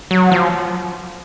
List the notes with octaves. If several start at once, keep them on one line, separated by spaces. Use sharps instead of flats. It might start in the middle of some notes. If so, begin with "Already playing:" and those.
F#3
F3